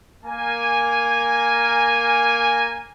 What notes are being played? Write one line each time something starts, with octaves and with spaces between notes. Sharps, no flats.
A#3 A#4 G#5